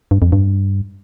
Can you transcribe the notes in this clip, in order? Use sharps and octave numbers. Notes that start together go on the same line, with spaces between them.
G2
F2
G2